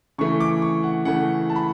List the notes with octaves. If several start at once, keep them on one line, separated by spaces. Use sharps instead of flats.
C#3 E3 A3 C#6
D6
C#6
F#5
C#3 E3 A3 F#5
A5
B5